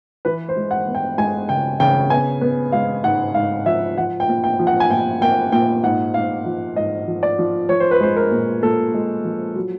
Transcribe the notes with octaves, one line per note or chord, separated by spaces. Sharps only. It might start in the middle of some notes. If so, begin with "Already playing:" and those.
E3 B4
C5
G#3
F#5
B3
G5
G#3 G#5
C#3 G5
C#3 G5
B3 G#5
B3
G#3 F5
G#2 F#5
G#2 F5
F3 E5
F3 F#5
G5
A#2
G5
F3
F#5
G#5
A#2 G5
A#3 G5
A#2 G5
G#2 F#5
G#2 F5
F3
G#2 D#5
F3
D5
F3
F3 C#5
C5
B4
G#3 C5
A#4
A#2
A#2 A4
G#3
F3
F#3